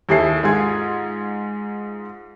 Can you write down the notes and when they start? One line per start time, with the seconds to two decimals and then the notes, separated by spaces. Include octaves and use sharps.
0.09 D#2 E4 G#4 A4 C7
0.43 G#2 F4 G#4 G#6